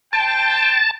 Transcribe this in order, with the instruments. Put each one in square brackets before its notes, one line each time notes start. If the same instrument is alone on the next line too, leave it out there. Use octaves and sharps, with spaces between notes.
[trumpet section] C5 G5 [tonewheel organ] A5